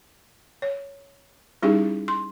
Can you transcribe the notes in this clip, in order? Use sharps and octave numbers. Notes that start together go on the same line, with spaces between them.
C#5
G3 C#4 D#4 E4 G4 G#4
C6